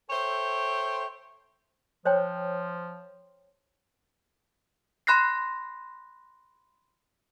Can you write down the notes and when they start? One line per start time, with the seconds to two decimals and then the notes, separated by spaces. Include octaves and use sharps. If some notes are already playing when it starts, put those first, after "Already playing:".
0.10 A4 C5 C#5 E5 G5
2.05 F3 C5 C#5 G5
5.07 B5 C6 F#6 A#6 C7